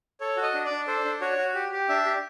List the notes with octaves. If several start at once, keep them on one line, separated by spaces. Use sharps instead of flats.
A4 C#5
F#4
D#5
D4
D5
D4
A4 C5
D4
F#4 C#5
F#4
G4
G4
D4 E5
G4